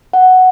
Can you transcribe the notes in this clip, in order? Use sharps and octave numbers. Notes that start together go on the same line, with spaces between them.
F#5